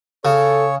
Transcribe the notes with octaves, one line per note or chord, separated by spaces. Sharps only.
C#3 A4 C#5